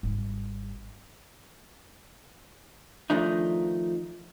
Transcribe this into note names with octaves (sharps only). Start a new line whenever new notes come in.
G#1 G3
D#3 F3 A3 D4 D#4